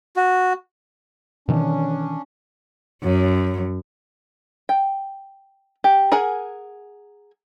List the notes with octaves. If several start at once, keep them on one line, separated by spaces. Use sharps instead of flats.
F#4
B2 D#3 E3 C#4 D4
F#2
G5
G4
G#4 A#4 F#5 G#5